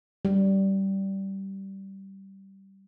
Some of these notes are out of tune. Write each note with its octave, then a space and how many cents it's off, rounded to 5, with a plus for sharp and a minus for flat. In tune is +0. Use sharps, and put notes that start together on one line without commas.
G3 -15